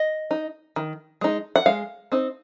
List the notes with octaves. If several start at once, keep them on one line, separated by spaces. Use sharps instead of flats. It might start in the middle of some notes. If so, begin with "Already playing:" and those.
Already playing: D#5
D#4
D#3
G#3 D#4
F#5
G#3 F5
C4 D#4